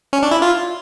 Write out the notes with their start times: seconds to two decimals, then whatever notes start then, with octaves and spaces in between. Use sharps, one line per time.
0.13 C#4
0.23 D4
0.31 E4
0.42 F4